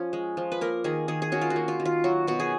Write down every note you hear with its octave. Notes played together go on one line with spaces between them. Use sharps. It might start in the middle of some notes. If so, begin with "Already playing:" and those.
Already playing: F3 C#4
G#3
F3
B4
A#3 A#4
D#3 G#4
D#3 G#4
G#4
C#4 F#4
F4
F#4
A#3
F4
D#3
F4
F#3 F#4
B2 F#4
G#4